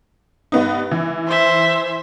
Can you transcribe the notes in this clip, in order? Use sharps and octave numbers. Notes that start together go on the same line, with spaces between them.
G2 B3 D#4
E3
C5 E5